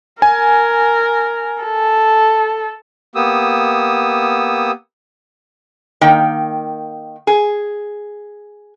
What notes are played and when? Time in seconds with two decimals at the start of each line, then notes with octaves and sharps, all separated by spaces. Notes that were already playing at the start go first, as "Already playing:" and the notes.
0.22 A#4 G#5
1.63 A4
3.15 A#3 B3 G4 D#6 E6
6.01 D#3 A#3 G5
7.27 G#4